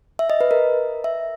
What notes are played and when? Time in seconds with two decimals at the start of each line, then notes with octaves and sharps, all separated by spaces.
0.19 E5
0.30 D#5
0.41 B4
0.51 A#4
1.04 E5